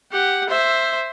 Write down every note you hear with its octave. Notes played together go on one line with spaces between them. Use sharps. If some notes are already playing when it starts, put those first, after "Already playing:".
G4 F#5
C5 E5